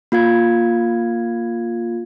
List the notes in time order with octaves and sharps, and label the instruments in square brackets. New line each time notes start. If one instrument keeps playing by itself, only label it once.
[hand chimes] A#3 F4 F5 G#6